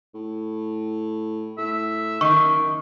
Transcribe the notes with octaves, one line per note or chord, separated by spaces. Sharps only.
A2
A2 E5
F#1 D#3 C#6